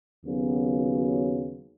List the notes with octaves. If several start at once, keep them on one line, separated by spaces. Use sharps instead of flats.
D#2 C#3 F#3 B3